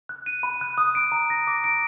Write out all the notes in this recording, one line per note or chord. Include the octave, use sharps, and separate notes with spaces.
F#6
D#7
B5
F#6
D#6
D7
A#5
A#6
D6
D7